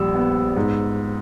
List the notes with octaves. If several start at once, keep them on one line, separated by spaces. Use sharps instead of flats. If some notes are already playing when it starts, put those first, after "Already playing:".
Already playing: A#1 G3 E6
B3
G#2